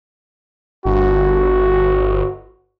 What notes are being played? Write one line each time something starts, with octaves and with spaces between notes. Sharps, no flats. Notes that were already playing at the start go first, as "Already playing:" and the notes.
G1 F#4